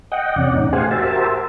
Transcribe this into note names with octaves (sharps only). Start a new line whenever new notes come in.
D#5 F#5 G5
E2 C3 C#4 D5 F#5
A2 D#4
G4 G#4 C5 F5 F#5 G#5
F#4 G4 A#4 C5 E5 A5